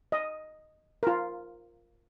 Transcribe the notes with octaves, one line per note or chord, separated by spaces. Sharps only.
D#5
F4 A#4